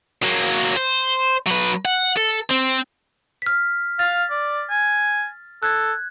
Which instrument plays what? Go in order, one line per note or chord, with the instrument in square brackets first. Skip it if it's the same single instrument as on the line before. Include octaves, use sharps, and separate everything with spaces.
[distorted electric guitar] F#3 A#3
C5
F#3 B4
F#5
A4
C4
[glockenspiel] F6 B6
[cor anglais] F5 [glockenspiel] A6
[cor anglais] D5
G#5
[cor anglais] A4 [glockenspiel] F#6 G#6